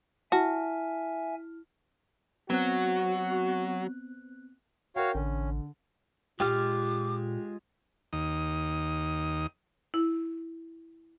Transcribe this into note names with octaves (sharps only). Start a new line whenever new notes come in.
E4 F#4 E5 G#5 A5 F6
F#3 B3 C4 F#4 F#6
F#4 A#4 C#5 F5 G5
A1 D3 C#4
A#2 G#3 F4 G4 D6 F6
D#2 D#6
E4